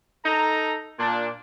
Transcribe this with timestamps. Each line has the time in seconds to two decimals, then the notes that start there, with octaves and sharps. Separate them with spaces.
0.24 D#4 A4 A#5
0.98 A#2 D4